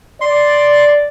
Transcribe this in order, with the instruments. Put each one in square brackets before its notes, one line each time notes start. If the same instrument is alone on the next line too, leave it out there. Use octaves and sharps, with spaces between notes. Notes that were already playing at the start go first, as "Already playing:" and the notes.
[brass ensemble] D5 [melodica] C6